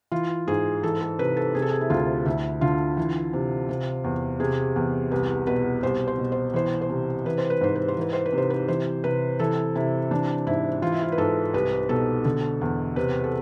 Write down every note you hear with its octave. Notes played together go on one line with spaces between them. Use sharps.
E3 F4
G#2 G#4
E3 A4
A4
C3 B4
A4
C3 G#4
A4
G#4
E4
D2 F4
D2 E4
D3 F4
E3
C3
C3
E2
C3 G#4
E2
C2 B4
B2 B4
C2 C5
C5
B2
C5
E3 C5
C5
C3
E3 B4
C5
B4
G#2 C5
B4
C5
E3 B4
C5
B4
C3
C5
B4
E3 C5
C3 B4
E3 A4
C3 E4
E3 D4
G#2 E4
E3 F4
E4
F4
B4
G#2 A4
C2 B4
B2 A4
D3 A4
E2
C3 B4
A4